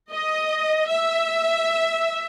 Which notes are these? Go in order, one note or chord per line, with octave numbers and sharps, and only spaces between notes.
D#5
E5